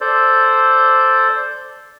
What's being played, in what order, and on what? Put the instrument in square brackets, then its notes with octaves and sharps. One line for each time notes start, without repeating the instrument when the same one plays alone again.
[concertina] A4 C5 D5